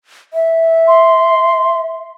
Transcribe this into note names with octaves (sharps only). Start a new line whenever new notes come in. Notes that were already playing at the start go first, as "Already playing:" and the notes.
E5
C6